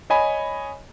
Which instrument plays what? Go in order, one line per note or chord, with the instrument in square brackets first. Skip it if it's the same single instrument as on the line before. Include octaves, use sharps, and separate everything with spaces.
[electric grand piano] C#5 D#5 G#5 B5